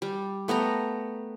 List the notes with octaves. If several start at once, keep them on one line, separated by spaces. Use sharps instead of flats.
G3
A3 B3 G5 A#5